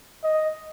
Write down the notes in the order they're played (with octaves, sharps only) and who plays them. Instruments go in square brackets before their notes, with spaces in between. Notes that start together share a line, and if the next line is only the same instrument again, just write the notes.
[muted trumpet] D#5